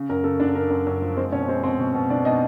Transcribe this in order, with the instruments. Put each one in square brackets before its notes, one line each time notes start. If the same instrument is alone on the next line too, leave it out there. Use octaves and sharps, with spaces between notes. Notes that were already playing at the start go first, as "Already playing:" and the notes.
Already playing: [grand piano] C#3
F#2 A#4
C#3 A4
F#2 D4 D5
C#3 A#4
F#2
F#2
F3
G#3 C4 C5
B2 C#4 C#5
G#3 C4 C5
B2 C4 C5
B2
B2
B2 D4 D5
B2 D#4 D#5